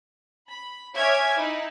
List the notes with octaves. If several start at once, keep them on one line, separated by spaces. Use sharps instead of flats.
B5
C#5 E5 G#5 D6 F6 G#6
D#4 E4